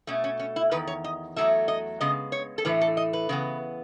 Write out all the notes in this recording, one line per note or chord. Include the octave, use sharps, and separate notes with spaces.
B2 A3 C#4
C#4
C#4
E4
E2 D#3 B4
C#5
D#5
E2 D#3 F#3 A3 E5
D#5
C#3 G#3 B3 D#5
C#5
A4
A2 E3 A3 B4
A4
D#5
B4
C#3 E3 B3